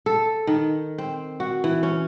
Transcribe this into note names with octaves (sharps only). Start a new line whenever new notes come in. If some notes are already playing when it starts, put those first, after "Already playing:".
A4
D#3
C4
F#4
E3
C#4